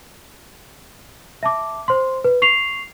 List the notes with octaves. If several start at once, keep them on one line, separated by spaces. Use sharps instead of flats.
E5 A5 D6
C5 C6
B4
C#6 C7 F7